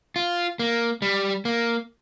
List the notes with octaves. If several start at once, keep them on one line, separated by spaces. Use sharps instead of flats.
F4
A#3
G3
A#3